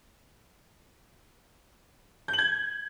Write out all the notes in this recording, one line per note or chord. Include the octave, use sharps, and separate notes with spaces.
G6
F#7
G#6